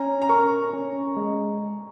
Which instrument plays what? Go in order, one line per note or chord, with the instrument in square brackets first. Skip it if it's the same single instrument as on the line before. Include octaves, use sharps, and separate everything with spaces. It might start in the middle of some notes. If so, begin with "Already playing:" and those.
Already playing: [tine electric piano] C#4 [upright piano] A#5
[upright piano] A#5
[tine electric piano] A#4 [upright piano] C#6
[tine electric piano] C#4
G#3